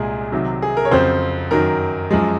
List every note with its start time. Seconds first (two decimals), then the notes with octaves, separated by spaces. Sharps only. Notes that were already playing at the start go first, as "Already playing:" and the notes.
Already playing: C2 A#2 G#3 G#4
0.32 C2 C3 D#3 F#3
0.62 G#4
0.77 A#4
0.85 C#5
0.91 F2 C#3 F#3 C4 C5
1.51 F#2 D#3 F#3 A#4
2.11 F#2 F3 G#3